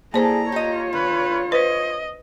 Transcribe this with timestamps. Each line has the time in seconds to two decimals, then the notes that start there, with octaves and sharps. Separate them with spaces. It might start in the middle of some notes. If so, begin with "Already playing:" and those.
0.14 A#3 E4 G#4 A4 C5 D5 A#5
0.52 F4 G4 C#5 D#5
0.93 D3 B4
1.52 B4 C5 D#5